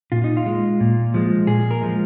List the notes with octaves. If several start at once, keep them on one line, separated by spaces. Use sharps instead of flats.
A#2 F4
D#4
F4
G#3
A#2
F3 G#3
A#2 G#4
A#4
F3 G#3